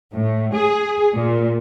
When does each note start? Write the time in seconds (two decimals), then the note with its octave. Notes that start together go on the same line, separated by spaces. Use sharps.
0.14 A2
0.53 G#4
1.14 A#2